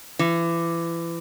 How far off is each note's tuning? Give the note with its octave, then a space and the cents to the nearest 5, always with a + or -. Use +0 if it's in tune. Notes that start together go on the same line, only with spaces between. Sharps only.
E3 +30